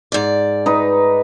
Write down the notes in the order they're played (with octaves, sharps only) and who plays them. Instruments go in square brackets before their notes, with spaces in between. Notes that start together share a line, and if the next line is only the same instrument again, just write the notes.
[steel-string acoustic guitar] G#2 D5
[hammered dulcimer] D#4 B4